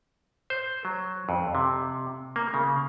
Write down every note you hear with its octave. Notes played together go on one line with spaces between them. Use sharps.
C5
F#3
F2
C3
A#3
C#3